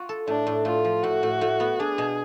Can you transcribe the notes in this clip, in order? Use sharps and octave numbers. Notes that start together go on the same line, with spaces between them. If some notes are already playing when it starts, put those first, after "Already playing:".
Already playing: F4 F#4
A4
A2 D4
A2
A2 F4
F3
A2 F#4
A2
A2
B3
D4 G#4
B2